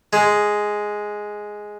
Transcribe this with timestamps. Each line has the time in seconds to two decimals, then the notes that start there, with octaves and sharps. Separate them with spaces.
0.13 G#3